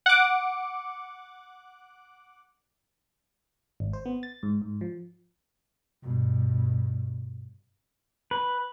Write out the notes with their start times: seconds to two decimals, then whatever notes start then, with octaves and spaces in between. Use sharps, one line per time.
0.06 F#5 D6
3.80 G#1
3.93 C5
4.06 B3
4.23 A6
4.43 G#2
4.62 G#2
4.81 F3
6.02 G2 B2
8.31 B4